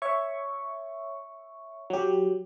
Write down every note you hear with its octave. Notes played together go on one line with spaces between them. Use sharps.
C#5 E5 C#6
F#3 G4